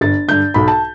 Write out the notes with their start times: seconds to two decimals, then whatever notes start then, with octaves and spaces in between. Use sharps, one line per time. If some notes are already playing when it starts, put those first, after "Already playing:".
0.01 G1 A6
0.28 G2 D3 G6
0.54 B1 B5
0.68 A5